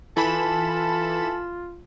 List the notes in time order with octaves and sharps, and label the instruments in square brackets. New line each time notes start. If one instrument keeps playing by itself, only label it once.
[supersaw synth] E3 B5 E7 [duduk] F4 [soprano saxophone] A4 [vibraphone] G#5 A5